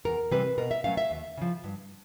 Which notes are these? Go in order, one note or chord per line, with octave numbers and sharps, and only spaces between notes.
E2 A#4
C3 E3 G3 C4 B4
B2 A#4
E5
F#3 A3 C#4 F5
E5
D#2
C#3 F3
G2